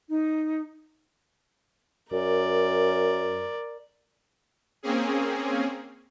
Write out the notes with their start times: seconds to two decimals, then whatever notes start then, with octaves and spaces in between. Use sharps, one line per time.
0.10 D#4
2.12 F#2 A#4 D5
4.83 A#3 C4 C#4 G#4